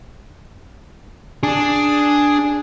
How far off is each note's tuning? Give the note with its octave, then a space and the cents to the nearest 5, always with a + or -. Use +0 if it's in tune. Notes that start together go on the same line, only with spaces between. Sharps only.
D4 +0 G#4 +0